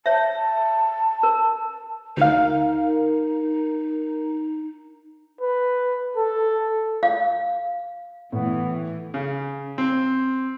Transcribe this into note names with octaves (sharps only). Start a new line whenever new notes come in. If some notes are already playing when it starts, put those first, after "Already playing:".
C#5 E5 A5
A#4
D2 D#4 A#4 F5
B4
A4
F5
A2 E3 B3
C#3
C4